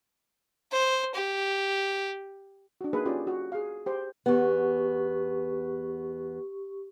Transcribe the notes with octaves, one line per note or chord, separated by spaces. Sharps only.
C5
G4
D4 F#4
A#3 D#4 G#4 B4
C#4 F4 G4 D5
F#4
G#4 F5
G4 C5
E2 B3 G4 C#6